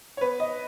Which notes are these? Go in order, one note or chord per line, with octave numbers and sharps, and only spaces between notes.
C#5
B3 B4
D#5